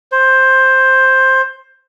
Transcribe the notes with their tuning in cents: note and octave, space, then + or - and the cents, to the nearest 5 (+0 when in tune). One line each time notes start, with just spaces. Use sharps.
C5 +10